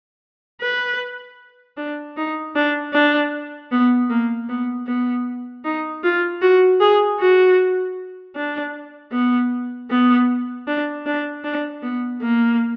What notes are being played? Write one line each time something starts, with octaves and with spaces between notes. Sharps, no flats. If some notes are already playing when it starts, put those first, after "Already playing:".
B4
D4
D#4
D4
D4
B3
A#3
B3
B3
D#4
F4
F#4
G#4
F#4
D4
B3
B3
D4
D4
D4
B3
A#3